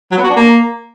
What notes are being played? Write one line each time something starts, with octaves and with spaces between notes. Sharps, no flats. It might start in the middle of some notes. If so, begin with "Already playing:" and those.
F#3
B3
F#4
D4
A#3